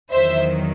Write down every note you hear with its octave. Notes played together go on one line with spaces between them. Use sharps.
E2 D#3 F#3 C5 E5